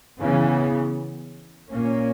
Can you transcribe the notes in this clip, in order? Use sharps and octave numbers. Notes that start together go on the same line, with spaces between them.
C#3 E3 B3
A#2 A#3 C#4